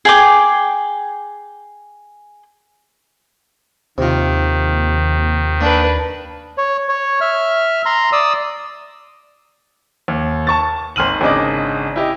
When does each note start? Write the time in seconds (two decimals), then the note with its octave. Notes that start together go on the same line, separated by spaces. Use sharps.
0.05 G#4 G5 D6
3.98 D#2 C3 D#3 F4
5.61 A#3 D4 B4
6.58 C#5
6.89 C#5
7.21 E5 F6
7.86 A#5 C6
8.12 D5 D#6 E6
10.08 D#2
10.47 A5 C#6 A6
10.96 G#1 C6 F6 D#7 F#7
11.21 G#1 C#3 D4 D#5 D6
11.96 E4 G4 D#5